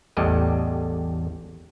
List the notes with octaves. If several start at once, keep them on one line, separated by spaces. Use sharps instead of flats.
A1 E2 A2 G3 D#5